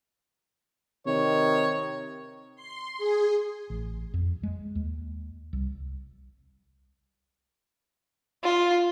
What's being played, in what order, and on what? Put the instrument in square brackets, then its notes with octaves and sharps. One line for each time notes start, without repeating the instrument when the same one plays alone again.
[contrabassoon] C3 [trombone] D#3 [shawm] C#5
[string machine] C6
G#4
[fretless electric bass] A1
F2
G#3
D#2
C2
[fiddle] F4